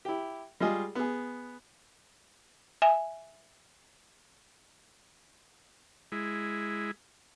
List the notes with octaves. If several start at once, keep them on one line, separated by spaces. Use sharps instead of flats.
E4 G4
G3 G#3 F4 G#4 D#5
B3 G#4
E5 G#5
G#3 E4